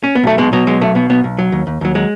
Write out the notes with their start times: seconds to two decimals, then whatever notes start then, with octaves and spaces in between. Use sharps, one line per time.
0.04 C#4
0.15 B3
0.24 B1 A3
0.38 B2 G#3
0.53 B2 F#3
0.67 F#3 G#3
0.81 B1 A3
0.95 B2 B3
1.10 B1 B3
1.24 B1
1.39 F#3
1.52 D#2
1.67 D#2
1.81 D#2 F#3
1.95 F#3 G#3